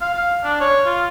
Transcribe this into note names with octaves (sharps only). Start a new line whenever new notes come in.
F5
F5
D4
C#5
F4